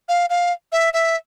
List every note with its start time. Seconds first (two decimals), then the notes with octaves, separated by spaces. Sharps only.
0.09 F5
0.30 F5
0.72 E5
0.94 E5